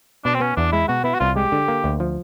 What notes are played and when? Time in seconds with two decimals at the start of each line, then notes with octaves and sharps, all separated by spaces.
0.25 B2 D4
0.34 C4
0.40 B3 C#4
0.56 E2 D4
0.72 G#3 E4
0.88 B2 F#4
1.04 B3 E4
1.14 F#4
1.20 C2 F4
1.36 G#3 G4
1.52 D3
1.68 A#3
1.84 D2
2.00 F3